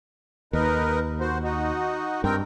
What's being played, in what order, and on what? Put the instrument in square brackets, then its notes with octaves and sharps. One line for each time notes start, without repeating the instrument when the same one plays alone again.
[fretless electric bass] D#2 [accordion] D#4 A#4 B4
[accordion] F#4 C5
D#4 F#4
[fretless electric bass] G2 [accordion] C4 A#4 G5